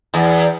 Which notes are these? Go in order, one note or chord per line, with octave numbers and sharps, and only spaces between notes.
E2